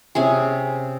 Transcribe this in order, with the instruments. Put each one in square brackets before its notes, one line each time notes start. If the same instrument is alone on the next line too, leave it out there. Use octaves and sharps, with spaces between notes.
[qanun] C3 C#4 G#4